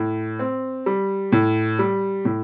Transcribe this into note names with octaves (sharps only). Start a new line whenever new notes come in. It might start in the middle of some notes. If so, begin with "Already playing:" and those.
Already playing: A2
C4
G3
A2
G3
A2